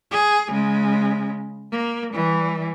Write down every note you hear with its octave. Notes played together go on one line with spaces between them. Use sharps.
G#4
C#3 G#3
A#3
E3 G3